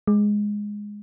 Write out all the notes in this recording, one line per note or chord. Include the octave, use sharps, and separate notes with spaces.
G#3